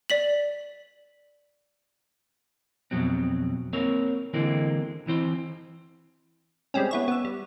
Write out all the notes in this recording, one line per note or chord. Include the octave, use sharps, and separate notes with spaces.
D5 B6 F#7
F2 B2 F#3 C4
A#3 C4 A#4 C#5
D3 E3 G#3 A#3 C4
E3 C4 C5
G3 G#3 C4 C#4
B3 E4 C#5
B3 E6
G3